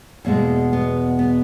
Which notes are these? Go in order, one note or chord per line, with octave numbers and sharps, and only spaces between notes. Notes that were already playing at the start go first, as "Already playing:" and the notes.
E2 B2 G#3 A#3
B3
B3